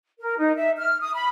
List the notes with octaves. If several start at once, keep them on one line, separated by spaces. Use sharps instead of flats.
A#4
D#4
E5
F6
D#6
B5